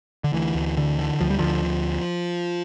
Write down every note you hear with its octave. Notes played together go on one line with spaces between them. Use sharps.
D3
D2 E3
D2
D3
D3
D2 F3
G3
D2 D3 F3